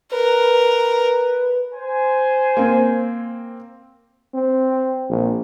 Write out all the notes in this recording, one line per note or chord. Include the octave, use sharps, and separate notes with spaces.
A#4 B4
C5 G#5
A#3 C4
C4
A#1